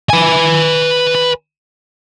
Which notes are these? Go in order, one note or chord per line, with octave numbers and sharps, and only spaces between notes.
B4 G#5